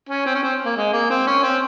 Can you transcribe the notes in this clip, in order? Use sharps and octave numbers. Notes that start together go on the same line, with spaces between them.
C#4
C4
C#4
C4
A#3
G#3
A#3
C4
C#4
C4